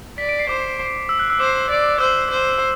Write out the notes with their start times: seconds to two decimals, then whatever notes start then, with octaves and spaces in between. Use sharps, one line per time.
0.18 D5 B6
0.29 D7
0.39 C7
0.49 C5 D6
1.09 E6
1.19 F#6
1.30 E6
1.40 C5 D6
1.70 D5
2.00 C5 E6
2.30 C5